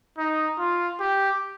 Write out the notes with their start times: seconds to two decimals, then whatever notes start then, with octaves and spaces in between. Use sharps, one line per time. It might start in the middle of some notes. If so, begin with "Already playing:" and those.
0.18 D#4
0.59 F4
1.00 G4